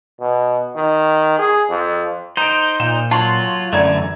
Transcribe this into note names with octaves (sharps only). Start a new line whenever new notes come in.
B2
D#3
G#4
F2
D#4 C5 A#5 D7
A#2 E7
F#3 F4 A5 C6 C#6
F#2 D3 E3 A3 D5 A#5 G#6